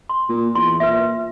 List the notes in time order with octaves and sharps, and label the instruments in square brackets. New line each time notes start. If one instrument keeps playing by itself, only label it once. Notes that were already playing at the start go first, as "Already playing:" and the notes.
[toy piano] C6
[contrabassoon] A#2
[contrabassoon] E2 [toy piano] C6
[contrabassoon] A#2 [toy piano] B4 E5